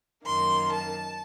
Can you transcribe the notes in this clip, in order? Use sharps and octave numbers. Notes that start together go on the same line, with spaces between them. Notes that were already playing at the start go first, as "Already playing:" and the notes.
F#2 D#3 A#3 C6
A5